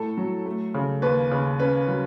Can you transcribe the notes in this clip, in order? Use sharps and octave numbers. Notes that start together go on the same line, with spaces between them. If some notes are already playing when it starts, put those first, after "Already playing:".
Already playing: A2 A3 A4
F#3
A3
C#3
D#2 B4
C#3
C#4 B4
F#3